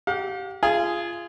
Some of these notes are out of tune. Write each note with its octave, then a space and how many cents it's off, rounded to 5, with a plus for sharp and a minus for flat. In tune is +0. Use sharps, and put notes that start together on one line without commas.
G4 -25 F5 +40
F4 -20 G#4 +0